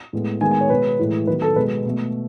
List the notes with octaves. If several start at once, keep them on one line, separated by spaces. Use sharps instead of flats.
A2 G#3 B3
D#3 G#3 B3 G#5
G#5
C#5
B2 G#3 B3 B4
A2 E3 G#3
D#3 F#3 B3 B4
A4
B2 G#3 B3 B4
B2 A3